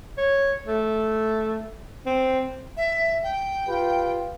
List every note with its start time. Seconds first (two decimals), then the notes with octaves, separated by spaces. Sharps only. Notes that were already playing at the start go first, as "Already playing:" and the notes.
0.18 C#5
0.67 A3
2.06 C4
2.77 E5
3.23 G5
3.67 F4 G4 B4